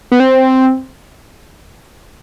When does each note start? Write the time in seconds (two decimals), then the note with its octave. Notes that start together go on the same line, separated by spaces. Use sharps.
0.12 B3
0.20 C4